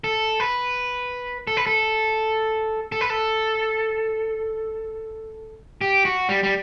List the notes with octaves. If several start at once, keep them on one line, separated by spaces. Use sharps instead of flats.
A4
B4
A4
B4
A4
A4
B4
A4
G4
F#4
G3
G3